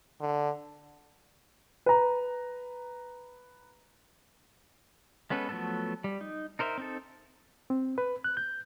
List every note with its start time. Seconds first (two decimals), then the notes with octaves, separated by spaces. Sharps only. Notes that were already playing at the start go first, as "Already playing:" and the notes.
0.21 D3
1.86 B4 A#5
5.30 G#3 B3 C#4 A4 B4
5.49 F3 F#3 A3 B3 A4
6.04 G3
6.21 D#4
6.59 D#4 A#4 C5 D5 E5
6.78 C4 D#4 A4
7.70 C4
7.98 B4
8.24 F#6
8.37 G6